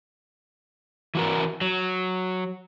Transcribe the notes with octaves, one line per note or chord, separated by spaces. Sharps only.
E3 F#4 A#4
F#3